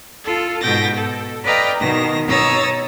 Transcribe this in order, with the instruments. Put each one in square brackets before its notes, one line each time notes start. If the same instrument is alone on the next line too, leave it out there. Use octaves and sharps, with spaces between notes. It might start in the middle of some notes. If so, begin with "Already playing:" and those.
[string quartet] F4 A4
G#2 B2 G5 A6 A#6
A4
B4 D5 D#5 F5 G5 A#5
B2 D#3 A#6
B2 C#5 A#5 D#6 E6 A6